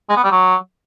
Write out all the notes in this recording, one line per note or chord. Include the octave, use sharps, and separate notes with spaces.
G#3
B3
G3
F#3